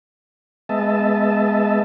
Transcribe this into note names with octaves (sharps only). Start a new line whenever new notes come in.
G#3 B3 D#5 E5 A5